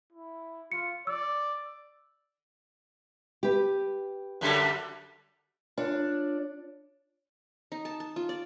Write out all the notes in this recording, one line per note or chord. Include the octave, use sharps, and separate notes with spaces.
E4
F4 C#7
D5 E6
G4 B4
F#2 D3 G3
D4 F4 C#5
D#4
A5
A5
F4
D5